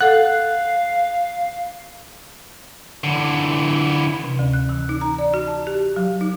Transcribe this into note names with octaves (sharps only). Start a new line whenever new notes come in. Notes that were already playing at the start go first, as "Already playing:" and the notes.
A4 F5 F#5 F#6
D3 E3
C3
D2
F#6
E3
D#4
A#5
D5
F#4
A5
G4
F#3
D#4